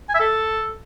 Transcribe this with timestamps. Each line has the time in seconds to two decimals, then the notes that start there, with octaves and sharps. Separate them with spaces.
0.09 G#5
0.15 E5
0.20 A4